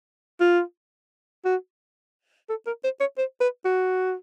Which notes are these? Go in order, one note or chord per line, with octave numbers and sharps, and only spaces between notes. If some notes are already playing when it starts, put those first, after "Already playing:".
F4
F#4
A4
A#4
C5
C#5
C5
B4
F#4